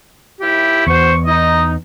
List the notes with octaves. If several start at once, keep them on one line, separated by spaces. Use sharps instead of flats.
D#2 E4 G4
E2 F#4 C5 C#6
D#4 D#5